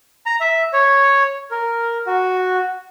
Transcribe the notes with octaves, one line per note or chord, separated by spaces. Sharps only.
A#5
E5
C#5
A#4
F#4